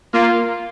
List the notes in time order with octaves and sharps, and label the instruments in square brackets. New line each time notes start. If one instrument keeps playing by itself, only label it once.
[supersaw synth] A#3 [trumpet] F4